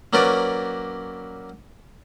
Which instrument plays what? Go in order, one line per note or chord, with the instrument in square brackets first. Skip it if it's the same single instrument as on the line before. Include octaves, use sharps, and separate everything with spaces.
[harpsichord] F#3 A#3 C#4 A#4 B4 D5